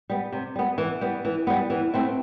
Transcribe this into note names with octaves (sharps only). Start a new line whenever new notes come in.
G3 B3
C3
G3 B3
E3
G3 B3
E3
G3 B3
E3
A3 C4 E4